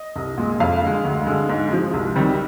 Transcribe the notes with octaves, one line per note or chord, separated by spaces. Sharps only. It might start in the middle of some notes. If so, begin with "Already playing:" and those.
Already playing: D#5
C2
A#2 G#3
F2 F5
D3 G#3
D2
D3 G#3
G#2
F3 G#3
C2
C3 D#3 G3